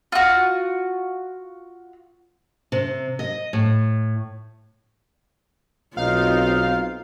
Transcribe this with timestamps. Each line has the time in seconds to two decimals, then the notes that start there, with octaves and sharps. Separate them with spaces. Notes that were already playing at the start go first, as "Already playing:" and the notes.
0.12 F4 F#4
2.72 C3
3.19 D#5
3.53 A2
5.97 B1 C4 D#4 F4 F5